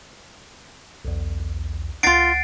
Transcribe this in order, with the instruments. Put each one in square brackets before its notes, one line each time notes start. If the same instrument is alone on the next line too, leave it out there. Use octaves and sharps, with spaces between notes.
[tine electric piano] B1 E2
[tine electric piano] C#2 F#5 [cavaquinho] D#4 F4 [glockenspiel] A6 C7 D7